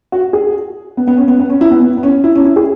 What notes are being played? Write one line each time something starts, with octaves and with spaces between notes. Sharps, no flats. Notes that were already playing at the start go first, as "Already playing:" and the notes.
F#4
G#4
B3
B3
C#4
B3
B3
C#4
E4
B3
B3
B3
C#4
E4
C#4
E4
G#4